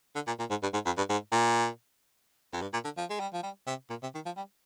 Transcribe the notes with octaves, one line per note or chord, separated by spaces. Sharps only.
D3
A#2
A#2
G#2
G2
G#2
F2
G2
G#2
A#2
F2
G2
A#2
D3
F3
G#3
G3
F3
G3
C3
A#2
C3
D#3
F3
G3